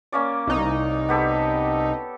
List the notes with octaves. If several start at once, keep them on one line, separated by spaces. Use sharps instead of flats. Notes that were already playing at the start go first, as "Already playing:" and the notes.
A#3 C#4 D5
C2 D#4
B3 G4 A4